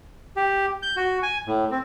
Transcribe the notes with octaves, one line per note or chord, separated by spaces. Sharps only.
G4
G6
F#4
G#5
A2
C4